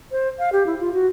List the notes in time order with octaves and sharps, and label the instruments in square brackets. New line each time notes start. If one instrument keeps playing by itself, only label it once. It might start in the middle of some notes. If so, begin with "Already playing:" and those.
[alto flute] C5
F5
G4
E4
F4
F#4